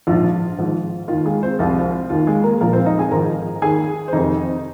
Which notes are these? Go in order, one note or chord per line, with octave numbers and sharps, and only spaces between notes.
A#1 G#2 F3 F4
G#1 G#2 F3
D#2 D#3 F4
G#3 G#4
C4 C5
C2 C3 F3 F4
D#2 D#3 F4
G#3 G#4
A#3 A#4
A#1 A#2 F3 A#3 A#4
C4 C5
D#4 D#5
G#4 G#5
G#1 G#2 F3 A#4 A#5
D#2 D#3 G#4 G#5
C5
F1 F2 C3 D#3 D#4 D#5